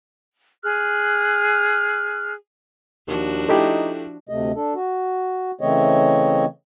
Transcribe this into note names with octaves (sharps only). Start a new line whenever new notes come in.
G#4 F6 F#6
D#2 F3 D4 F#4
A3 D#4 E4 G4
D2 C3 A3 D#5
D4 A4
F#4
C#3 E3 A3 C4 C#5 D#5